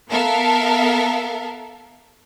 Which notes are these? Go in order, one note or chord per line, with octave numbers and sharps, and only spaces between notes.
B3 A4 A#4 E5 F5 A5